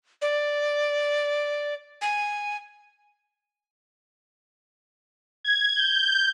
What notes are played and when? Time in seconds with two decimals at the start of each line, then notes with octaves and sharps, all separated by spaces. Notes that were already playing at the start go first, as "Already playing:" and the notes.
0.22 D5
2.02 G#5
5.44 G#6
5.76 G6